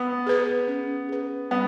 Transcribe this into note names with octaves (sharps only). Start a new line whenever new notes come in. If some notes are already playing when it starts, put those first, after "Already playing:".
Already playing: B3
G#4 B4
C#4
G#4 B4
G3 B3